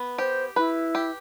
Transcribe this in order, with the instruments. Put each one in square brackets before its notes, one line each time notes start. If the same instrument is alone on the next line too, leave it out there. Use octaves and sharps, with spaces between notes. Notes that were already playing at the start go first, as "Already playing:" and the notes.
Already playing: [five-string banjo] B3
[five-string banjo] G4 [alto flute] C5
[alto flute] E4 [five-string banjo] B4
[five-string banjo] G4